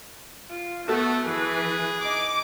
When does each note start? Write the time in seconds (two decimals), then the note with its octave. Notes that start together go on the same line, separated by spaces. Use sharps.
0.49 F4
0.88 A3 B3 F#4 A4
1.24 E3 G#4 B4
2.03 D#4 D6